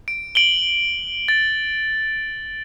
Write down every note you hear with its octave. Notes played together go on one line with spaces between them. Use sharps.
D7
D7 F#7 G7
A6